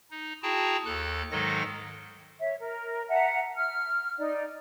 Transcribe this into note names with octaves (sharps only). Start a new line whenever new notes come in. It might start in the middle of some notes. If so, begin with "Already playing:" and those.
D#4
E4 F#4 G#4 G5 A5 A#5
D#2 A4 F#6
G#2 D#3 F#3 G#3 A4 A#6
C#5 E5
A#4
E5 F#5 A5 A#5
F6
D#4 D5